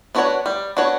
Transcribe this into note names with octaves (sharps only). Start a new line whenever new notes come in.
B3 D4 F#4 C#5
G3
B3 D4 F#4 C#5